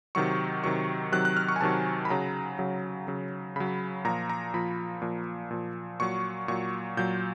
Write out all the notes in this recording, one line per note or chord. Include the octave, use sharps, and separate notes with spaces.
C3 D#3 F#3 C#6
C3 D#3 F#3 C#6
C3 D#3 F#3 F#6
F#6
F6
C#6
G#5
C3 D#3 F#3 A5
B5
C#3 F#3 A#5
C#3 F#3
C#3 F#3
C#3 F#3 B5
A#2 F3 A#5
A#5
A#2 F3 B5
A#2 F3
A#2 F3
A#2 F#3 C#6
A#2 F#3 C#6
A#2 F#3 G6